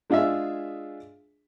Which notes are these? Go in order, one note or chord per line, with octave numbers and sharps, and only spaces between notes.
G#3 D4 F4 G#4 E5